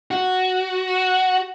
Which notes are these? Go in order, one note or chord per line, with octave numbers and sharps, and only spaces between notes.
F#4